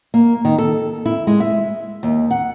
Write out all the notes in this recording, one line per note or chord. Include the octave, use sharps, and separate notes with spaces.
A#3
D#3
A4
E4
G#3
E5
D#2
F#5